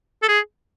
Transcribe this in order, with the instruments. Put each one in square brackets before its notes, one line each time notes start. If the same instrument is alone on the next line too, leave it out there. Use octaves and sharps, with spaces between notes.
[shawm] A4
G#4